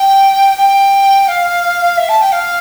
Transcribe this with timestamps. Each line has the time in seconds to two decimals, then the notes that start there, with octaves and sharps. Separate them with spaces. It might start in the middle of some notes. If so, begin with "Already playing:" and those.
Already playing: G5
0.58 G5
1.28 F5
1.98 E5
2.09 A5
2.21 G5
2.32 F5